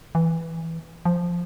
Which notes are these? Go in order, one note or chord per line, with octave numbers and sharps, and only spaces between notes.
E3
F3